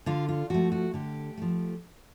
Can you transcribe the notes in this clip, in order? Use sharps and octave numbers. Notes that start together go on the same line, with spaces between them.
D3 F4
F4
F3 A3 F#4
F#4
D3 G4
F3 A3